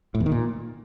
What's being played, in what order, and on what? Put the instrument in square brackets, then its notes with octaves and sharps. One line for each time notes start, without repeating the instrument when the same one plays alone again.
[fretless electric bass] A2
E2
D#3
A#2